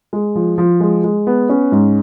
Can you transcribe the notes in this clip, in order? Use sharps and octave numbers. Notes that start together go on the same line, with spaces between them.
G#3
F3
F3
G#3
G#3
B3
C#4
G#2